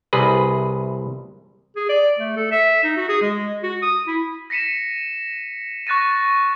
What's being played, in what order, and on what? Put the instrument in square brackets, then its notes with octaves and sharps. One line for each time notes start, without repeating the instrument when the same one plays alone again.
[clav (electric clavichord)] C2 C3 G#4 B4
[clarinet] G#4
D5
A3
A4
E5
D#4
F#4
G#4
G#3
F#4
D#6
E4
[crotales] A#6 B6 C#7 D#7 E7
C#6 F#6 A6 A#6 D#7